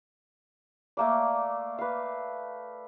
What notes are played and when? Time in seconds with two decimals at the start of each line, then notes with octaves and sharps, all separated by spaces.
0.97 A3 A#3 D5
1.78 B4 F5